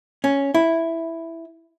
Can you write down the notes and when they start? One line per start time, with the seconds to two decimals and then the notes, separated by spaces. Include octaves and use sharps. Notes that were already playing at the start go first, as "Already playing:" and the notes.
0.24 C#4
0.54 E4